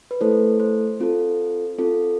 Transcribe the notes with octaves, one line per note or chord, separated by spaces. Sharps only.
B4
A3 E4 A4 C5
C5
C4 F4 A4
C4 F4 A4